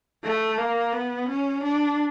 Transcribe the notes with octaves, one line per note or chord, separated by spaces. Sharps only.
A3
A#3
B3
C#4
D4